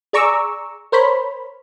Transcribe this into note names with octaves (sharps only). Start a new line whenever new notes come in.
G#4 D5 A#5 C#6 D6 E6
A#4 C5 C#5 B5